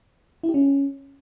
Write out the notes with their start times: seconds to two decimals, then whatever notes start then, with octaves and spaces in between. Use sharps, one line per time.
0.43 E4
0.49 G4
0.54 C#4